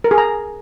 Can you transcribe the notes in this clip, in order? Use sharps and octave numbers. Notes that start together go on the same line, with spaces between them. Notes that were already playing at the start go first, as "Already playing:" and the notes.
A#4
G#4
A#5